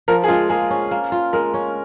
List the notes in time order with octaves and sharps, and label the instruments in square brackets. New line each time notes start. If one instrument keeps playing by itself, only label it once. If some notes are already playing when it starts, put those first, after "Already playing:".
[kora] F3 [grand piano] A#4
[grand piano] G#4
[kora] G#3 [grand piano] F4
[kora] A#3 [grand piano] G#4
[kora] C#4
A#3
F4
[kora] G#3 [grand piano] A#4
[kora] C#4